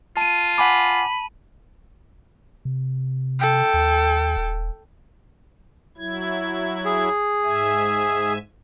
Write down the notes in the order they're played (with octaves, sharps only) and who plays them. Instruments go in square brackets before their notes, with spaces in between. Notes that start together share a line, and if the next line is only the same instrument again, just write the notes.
[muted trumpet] F4 [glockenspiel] A5 D#7
[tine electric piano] F#5 G#5 D6 [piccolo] B5
[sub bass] C3
[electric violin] A4 G5
[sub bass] D#2
D#1
[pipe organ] F#3 E4 G#6
[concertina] G#4
[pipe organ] G#2 E5 G#5